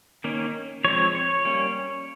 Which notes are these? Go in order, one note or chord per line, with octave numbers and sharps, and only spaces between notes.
D#3 A#3 C#4
F3 G#3 C4 C#5
C#5
G3 A#3 C#4